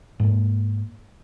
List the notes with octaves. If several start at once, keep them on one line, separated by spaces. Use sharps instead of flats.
G#2 A#3